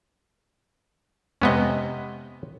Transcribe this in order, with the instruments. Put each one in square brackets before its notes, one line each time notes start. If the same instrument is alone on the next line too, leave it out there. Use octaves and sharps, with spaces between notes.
[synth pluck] F2 G#3 D#5 [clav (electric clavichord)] C3 B3 C#4